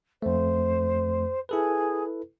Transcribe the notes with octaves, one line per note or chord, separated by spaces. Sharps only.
F2 A3 C5
E4 G#4 A4 B4